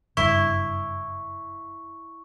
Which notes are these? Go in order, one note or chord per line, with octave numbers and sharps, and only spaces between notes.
F#1 G2 E4 C#6